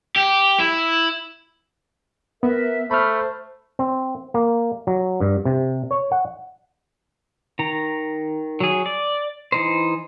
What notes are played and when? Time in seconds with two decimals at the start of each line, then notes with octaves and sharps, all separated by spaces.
0.16 G4
0.60 E4
2.43 B3 A#4 B4 E5
2.91 A3 C5 B5 F6
3.79 C4
4.34 A#3
4.87 F#3
5.20 G2
5.45 C3
5.91 C#5
6.12 F#5
7.59 D#3 A#5
8.60 F#3 G#4
8.86 D5
9.52 E3 D#4 C5